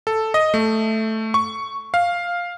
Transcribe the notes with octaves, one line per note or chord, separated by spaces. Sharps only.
A4
D#5
A3
C#6
F5